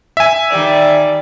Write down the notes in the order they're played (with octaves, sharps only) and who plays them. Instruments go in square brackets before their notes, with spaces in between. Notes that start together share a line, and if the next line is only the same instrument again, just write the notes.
[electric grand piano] E5 G#5
[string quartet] D#3 G3 D5